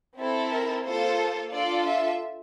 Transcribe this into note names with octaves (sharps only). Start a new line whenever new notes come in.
C4 E4 A4
A#4
A#3 F4 A4 C5
D4 F4 A4 D5
E5